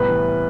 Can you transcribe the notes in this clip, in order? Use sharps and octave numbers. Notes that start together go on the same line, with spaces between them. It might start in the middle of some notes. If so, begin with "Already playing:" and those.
Already playing: C2 A2 B3 B4
E3